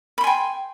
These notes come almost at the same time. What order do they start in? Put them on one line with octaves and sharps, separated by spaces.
B5 C6 G#5 G5